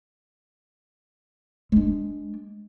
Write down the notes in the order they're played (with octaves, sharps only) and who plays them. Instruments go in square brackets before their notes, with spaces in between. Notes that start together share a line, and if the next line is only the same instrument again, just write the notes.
[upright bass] G#3 D4